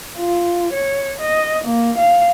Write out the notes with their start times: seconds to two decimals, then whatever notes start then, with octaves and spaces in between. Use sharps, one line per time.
0.18 F4
0.74 C#5
1.21 D#5
1.65 A#3
1.99 F5